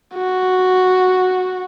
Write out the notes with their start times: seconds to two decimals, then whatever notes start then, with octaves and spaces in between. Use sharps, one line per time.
0.15 F#4